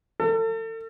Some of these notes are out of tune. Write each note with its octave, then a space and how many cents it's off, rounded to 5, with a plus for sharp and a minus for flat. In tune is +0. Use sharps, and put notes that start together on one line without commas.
A4 +40